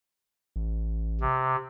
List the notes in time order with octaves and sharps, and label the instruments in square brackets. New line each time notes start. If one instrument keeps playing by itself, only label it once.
[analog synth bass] A1
[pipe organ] C3